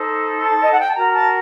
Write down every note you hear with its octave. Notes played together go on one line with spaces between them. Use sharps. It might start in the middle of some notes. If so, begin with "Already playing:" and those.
Already playing: D#4 A4 C5
A5
D#5
F#5
G5
A5
F#4 A#4 A#5
A5